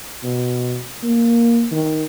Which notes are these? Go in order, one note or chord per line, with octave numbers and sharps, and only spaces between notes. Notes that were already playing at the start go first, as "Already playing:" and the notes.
B2
A#3
D#3